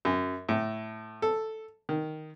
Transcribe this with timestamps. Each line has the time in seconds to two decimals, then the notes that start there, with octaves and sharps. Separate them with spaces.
0.05 F#2
0.49 A2
1.22 A4
1.89 D#3